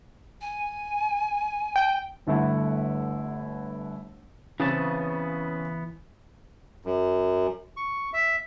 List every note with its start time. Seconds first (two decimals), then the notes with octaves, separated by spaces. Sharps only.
0.41 G#5
1.76 G5
2.27 G1 D3 A3 E4 F#5
4.60 C#3 E3 B3 C4 A5
6.85 F#2
7.77 C#6
8.13 E5